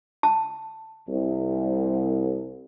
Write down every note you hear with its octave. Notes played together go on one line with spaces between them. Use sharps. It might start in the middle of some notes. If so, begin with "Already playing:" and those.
A5
C2